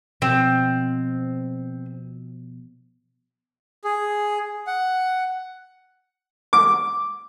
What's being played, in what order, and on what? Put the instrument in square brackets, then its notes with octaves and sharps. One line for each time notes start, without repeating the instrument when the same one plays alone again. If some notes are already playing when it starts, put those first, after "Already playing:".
[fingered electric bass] B2 F3 [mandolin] C4
[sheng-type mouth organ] G#4
F#5
[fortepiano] D6